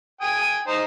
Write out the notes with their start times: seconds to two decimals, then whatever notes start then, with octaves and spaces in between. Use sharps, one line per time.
0.21 G5 G#5 D#6
0.67 D#4 C5